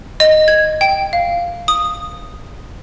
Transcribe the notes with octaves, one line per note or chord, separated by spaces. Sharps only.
D#5
G#6
G5
F5
D#6